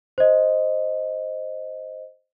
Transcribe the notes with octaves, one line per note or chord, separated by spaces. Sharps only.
C5 D#5